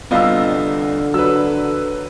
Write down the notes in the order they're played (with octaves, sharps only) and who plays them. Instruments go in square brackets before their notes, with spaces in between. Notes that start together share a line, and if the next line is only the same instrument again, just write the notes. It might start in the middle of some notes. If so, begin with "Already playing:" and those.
[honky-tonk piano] C2 E6 [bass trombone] D3 [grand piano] B3 F4 D#5
[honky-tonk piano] F#3 B4 [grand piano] E6